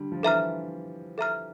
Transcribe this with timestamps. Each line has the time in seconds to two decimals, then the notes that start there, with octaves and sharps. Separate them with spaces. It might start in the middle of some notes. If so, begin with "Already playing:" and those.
Already playing: D3 G3
0.12 F3
0.23 E3 A4 E5 A#5 F6
1.18 A4 E5 A#5 F6